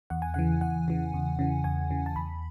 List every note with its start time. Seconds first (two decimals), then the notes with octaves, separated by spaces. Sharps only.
0.10 E2 F#5
0.22 G#5
0.34 C#3 E3 F#5
0.61 E2 F#5
0.88 C#3 E3
1.14 E2
1.39 C#3 E3
1.64 E2 G#5
1.90 C#3 E3
2.06 A5
2.16 E2 B5